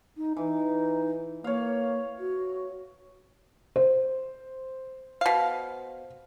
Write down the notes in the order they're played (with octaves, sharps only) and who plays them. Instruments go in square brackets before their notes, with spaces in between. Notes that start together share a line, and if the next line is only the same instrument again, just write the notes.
[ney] D#4
[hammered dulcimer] E3 [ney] D#4
[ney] A#3 [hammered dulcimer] C#5 F5
[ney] F#4
[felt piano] C5
[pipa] B2 F5